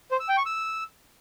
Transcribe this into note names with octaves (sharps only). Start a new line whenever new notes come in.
C5
E6
G5
C#6
E6